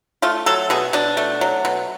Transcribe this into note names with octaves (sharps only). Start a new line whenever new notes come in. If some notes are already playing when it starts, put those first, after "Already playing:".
A3 F4
F#3 A4
B2 G#4
B2 D4
A3
F#3
B2